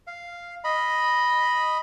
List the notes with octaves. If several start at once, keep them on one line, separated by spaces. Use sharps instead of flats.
F5
D#5 B5